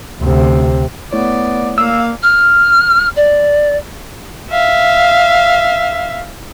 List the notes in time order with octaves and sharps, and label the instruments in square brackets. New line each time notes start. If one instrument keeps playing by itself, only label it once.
[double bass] D2 C3
[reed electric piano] A3 E4 C#5 [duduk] B3 [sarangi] D5
[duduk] A#3 [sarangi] F5 [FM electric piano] E6
[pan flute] F6
D5
[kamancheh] E5 F5